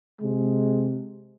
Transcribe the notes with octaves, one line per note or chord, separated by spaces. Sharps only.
C3 G#3